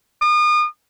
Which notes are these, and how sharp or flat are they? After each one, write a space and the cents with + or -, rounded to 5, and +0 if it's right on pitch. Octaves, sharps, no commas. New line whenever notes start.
D#6 -40